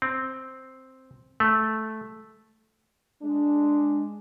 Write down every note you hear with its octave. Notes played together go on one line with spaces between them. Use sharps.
C4
A3
G#3 D4